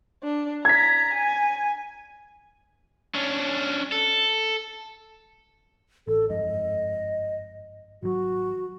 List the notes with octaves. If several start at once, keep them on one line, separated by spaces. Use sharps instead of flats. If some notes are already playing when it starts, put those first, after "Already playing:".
D4
A#5 G#6 B6
G#5
C#4 D4
A4
A1 A4
G1 F2 G#2 D#5
G#1 F#3 F#4